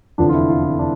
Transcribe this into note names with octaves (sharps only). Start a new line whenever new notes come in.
F1 E2 D3 F3 D4
F4
E4
F4
E4
D4